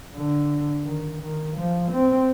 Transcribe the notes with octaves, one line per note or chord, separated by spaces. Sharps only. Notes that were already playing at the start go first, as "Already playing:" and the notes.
D3
D#3
D#3
F3
C4